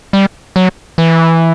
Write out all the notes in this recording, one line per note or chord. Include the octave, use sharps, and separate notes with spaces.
G3
F#3
E3